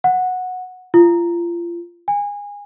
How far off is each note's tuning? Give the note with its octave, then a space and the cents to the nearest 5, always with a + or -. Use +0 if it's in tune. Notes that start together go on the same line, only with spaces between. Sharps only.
F#5 -10
F4 -30
G#5 -25